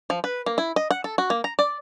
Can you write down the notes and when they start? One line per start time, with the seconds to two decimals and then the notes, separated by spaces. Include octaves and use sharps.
0.10 F3
0.24 B4
0.46 A#3
0.58 E4
0.76 D#5
0.91 F#5
1.04 A4
1.18 F#4
1.30 A#3
1.44 A#5
1.59 D5